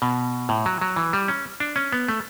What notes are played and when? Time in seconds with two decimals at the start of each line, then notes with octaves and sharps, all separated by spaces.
0.02 B2
0.49 A2
0.66 F#3
0.81 F#3
0.96 E3
1.13 G3
1.28 C#4
1.60 D4
1.76 C#4
1.92 B3
2.09 A3